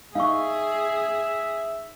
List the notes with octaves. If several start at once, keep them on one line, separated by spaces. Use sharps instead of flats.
D#4 G#4 E5 F5 C#6